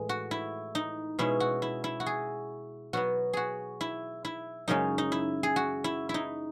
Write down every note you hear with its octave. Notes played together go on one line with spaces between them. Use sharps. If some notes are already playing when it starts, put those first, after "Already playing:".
Already playing: A2 E3 G#3 G#4
F#4
E4
D#4
B2 G#3 C#4 E4
F#4
E4
E4
F#4
G#4
B2 F#3 B3 F#4
F#4 G#4
E4
E4
F#2 C#3 G#3 C#4 D#4
D#4
E4
G#4
F#4
E4
E4
D#4